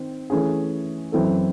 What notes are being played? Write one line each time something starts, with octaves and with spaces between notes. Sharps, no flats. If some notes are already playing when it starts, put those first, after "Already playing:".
Already playing: D#3 C4
E3 A3 C#4 G#4
F#2 E3 C4 E4 A4